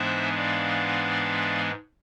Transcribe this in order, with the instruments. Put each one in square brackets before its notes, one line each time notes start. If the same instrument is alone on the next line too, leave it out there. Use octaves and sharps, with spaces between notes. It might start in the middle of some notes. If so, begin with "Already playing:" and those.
Already playing: [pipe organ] G#2 E3 G#3 B3 D4 C5 E5
D5 F5